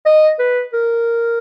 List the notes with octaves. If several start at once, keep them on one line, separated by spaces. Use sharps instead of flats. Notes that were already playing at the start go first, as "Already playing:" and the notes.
D#5
B4
A#4